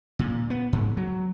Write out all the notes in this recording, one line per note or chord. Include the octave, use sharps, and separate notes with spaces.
A#2
B3
G#2
F#3